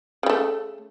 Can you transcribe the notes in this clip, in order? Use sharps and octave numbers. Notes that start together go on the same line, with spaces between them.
C#3 G3 A3